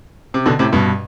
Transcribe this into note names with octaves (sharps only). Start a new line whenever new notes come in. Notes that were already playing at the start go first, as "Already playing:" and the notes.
C3
B2 D3
A2 C3
G2 B2